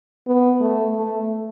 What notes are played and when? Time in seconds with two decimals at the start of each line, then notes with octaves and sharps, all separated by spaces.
0.27 B3
0.61 A3
0.95 A3